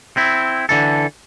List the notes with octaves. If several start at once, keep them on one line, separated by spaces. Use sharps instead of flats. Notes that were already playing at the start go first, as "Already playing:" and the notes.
C4 E4
D3 E3 A4